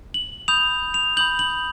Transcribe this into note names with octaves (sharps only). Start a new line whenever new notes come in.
F#7
B5 D#6 G6 F7
F7
B5 D#6 G6 F#7
F#7